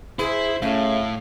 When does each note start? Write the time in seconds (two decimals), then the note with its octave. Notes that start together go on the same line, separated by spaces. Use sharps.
0.19 E4 G#4 C5
0.62 A2 C#3 A3 C#4 F5